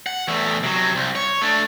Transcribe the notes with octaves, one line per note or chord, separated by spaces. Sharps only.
F#5
E2 A3
C3 F#3
C2
C#5
A3 D4